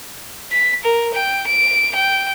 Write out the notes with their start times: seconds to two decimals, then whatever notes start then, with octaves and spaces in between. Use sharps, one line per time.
0.51 B6
0.83 A#4
1.14 G5
1.46 D7
1.95 G5